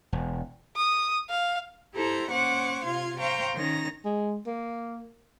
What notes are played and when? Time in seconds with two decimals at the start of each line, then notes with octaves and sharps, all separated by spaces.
0.13 E1
0.76 D#6
1.30 F5
1.94 E4 G4 A4 C5 A#5
2.30 A#3 C#4 C5 F#5 C#6 D6
2.83 C3 F4 F5 C6 G#6
3.19 C5 F5 G5 A#5 C#6
3.53 D#3 C#4 A#5 A#6
4.05 G#3
4.47 A#3